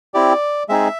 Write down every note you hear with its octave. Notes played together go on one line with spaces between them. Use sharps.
C4 E4 G4 D5
G#3 C4 D#4 G#4 E5